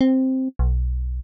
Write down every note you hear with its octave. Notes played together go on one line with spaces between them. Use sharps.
C4
B1